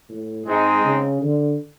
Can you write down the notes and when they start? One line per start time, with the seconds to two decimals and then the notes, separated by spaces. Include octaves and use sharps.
0.09 A2
0.46 G#2 G#3 C4 D#4
0.84 C#3
1.21 D3